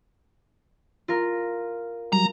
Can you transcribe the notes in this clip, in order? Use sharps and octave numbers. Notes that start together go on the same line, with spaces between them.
F4 A#4
F#3 G3 A#5